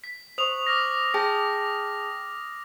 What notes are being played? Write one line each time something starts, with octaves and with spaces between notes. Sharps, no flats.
B6
C5 C#6 D#6 F7
D6 F6 A#6
G#4 G5 A5 A#6